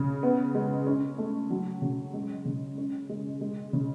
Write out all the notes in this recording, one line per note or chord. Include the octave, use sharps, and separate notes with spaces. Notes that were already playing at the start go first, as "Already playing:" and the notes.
Already playing: C#3
B3
G#3
C#4
A3
F#3
C#3
G#3
C#3
C#4
G#3
G#3
C#3